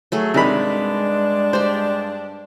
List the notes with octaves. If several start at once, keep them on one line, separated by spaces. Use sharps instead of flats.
F#3 A3 G#4
G2 C3 D#3 G#3 D4 G#4 B5
G4 C5 D5